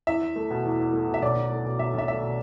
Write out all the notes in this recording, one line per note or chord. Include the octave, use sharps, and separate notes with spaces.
E2 E5
E2
A3
B2
E2
E2
A3
B2
E5
B1 D5
B1
A3
B2
B1 E5
B1 E5
A3 E5
B2